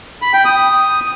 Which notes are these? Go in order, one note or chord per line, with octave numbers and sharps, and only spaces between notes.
B5
G5
D#6